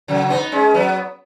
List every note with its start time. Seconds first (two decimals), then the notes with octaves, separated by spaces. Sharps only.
0.08 C#3 F#3
0.30 B3 D#4
0.52 G#3 C#4
0.74 F#3 B3